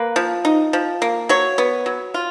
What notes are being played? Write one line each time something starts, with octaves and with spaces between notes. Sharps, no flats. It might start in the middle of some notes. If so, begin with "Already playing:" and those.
Already playing: A#3 B4
F3
D#4
F3
A#3
F#3 C#5
B3
F#3
F4